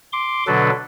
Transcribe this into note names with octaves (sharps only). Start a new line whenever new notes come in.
C6 D6
B2 D3 F#3 D4 A4 B4